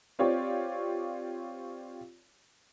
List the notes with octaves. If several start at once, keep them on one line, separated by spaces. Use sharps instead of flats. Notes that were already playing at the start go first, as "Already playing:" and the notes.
C4 F4 G4 C#5 D5